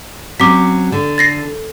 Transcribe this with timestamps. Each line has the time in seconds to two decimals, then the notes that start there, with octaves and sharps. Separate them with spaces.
0.40 F#3 C4 C#4 D6 B6
0.92 D3
1.18 A6 A#6 C7